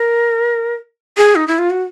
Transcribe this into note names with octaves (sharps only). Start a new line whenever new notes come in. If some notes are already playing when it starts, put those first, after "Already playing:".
Already playing: A#4
G#4
D#4
E4
F4
F#4